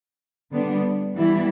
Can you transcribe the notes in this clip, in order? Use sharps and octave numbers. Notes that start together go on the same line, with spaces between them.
D3 G3 B3 D4
E3 G3 B3 E4